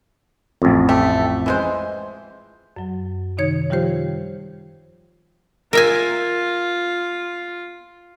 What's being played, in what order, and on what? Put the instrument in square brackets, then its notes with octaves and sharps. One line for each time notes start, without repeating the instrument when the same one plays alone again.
[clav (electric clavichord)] A1 F2
[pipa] A3 G4
E3 G#3 C5
[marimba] F#2 F#3
C3 D#3 D#4 C#5 G#6
D#3 F3 G3 F4 G4 C5
[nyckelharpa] F4 [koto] A#4 E5 G#5